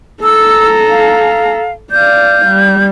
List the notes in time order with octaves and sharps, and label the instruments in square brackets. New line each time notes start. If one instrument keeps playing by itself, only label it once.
[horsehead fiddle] A4 A#5 [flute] E6
[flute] F5
[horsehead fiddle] D5 F5 [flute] G6
[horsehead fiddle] G3